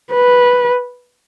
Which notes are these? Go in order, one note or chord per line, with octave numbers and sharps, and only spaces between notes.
B4